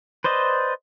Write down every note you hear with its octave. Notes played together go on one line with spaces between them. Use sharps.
B4 C5 D5 D#5